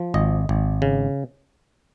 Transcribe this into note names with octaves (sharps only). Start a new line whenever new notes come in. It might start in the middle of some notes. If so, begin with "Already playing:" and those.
Already playing: F3
G#1 D#5
G#1
C#3